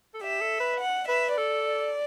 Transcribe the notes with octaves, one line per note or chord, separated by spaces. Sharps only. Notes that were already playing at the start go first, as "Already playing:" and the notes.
A4
G4 E5
A4
B4
F#5
B4 E5
A4 D5